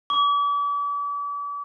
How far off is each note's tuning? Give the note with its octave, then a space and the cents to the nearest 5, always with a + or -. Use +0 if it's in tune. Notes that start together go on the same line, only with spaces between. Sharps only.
D6 -40